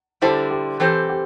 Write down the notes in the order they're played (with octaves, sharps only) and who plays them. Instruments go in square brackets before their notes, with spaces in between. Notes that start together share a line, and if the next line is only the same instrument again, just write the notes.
[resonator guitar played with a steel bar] D3 G3 E4 A4 C5 [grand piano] G4
[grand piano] G4
[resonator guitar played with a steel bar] E3 C4 A4 C5 [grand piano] G4
[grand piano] G4